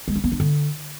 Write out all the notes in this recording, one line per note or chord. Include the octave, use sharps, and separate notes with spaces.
G#3
D4
B3
D4
D3